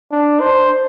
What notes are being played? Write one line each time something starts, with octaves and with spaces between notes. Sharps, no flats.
D4
C5